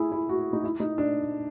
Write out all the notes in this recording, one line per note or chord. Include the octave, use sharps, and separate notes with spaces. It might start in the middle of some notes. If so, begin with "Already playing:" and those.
Already playing: E4 G#4
E4
F#4
D#4
E4
D#4
D4